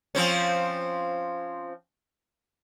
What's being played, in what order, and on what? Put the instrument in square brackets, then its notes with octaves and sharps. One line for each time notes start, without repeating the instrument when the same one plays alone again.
[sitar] F3 C4 C#4